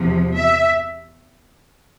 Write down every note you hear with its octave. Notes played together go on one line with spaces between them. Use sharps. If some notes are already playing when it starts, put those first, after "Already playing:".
Already playing: E2 C3 F3
E5